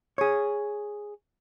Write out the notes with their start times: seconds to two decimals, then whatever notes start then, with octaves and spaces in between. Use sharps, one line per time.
0.18 G#4 C#5